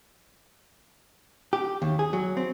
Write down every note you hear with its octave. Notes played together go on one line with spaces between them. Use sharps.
G4
D#2
G#4
F#3
C4